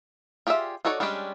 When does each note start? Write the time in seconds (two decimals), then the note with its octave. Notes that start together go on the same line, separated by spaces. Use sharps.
0.47 F4 G4 G#4 D5 E5
0.85 D#4 F#4 A4 C#5 D5
1.00 G3 G#3 C#4 D4 G4